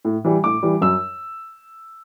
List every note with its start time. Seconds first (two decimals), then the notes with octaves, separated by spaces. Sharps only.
0.05 A2
0.25 E3 G3
0.44 A2 D6
0.63 E3 G3
0.81 F#2 E6